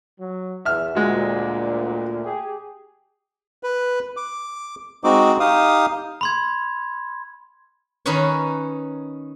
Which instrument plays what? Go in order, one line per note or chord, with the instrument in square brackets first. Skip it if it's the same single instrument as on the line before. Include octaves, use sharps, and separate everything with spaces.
[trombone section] F#3
[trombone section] E2 [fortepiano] E5 F6
[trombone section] D2 A#2 [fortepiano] G#3 F#4
[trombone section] G4 G#4
[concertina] B4
D6
G#3 C4 D#4 F#4 D6
D#4 G4 F5 D#6
[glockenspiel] B5 C6 G#6
[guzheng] D#3 C#4 D#4 B4 C#5